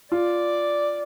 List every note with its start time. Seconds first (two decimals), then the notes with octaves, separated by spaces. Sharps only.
0.12 F4 D5